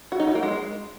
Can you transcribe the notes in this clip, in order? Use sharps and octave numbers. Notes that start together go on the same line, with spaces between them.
F#4
D#4
F#4
A#3
G#3